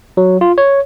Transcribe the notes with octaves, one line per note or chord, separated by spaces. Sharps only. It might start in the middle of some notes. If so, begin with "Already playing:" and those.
F#3
F4
C#5